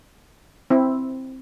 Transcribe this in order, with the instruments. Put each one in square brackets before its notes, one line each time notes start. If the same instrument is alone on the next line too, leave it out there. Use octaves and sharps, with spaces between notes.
[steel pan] C4 E4